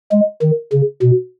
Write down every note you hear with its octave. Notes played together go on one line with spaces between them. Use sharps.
G#3
D#3
C#3
B2